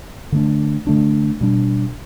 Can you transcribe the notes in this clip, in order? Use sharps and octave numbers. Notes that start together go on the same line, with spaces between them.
D3 A3 D4
D3 A3 D4
B2 G3 D4